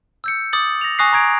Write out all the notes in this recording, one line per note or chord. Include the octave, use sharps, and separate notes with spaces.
E6 G6 C#7
D6 D#6 A6 F#7
A#6 F7
G#5 C#6 D#6 F#6 A#6 C7
A#5 C#6 G#6 D7